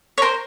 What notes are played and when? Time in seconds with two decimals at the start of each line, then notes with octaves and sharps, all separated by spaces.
0.18 C#5
0.22 A#4 C5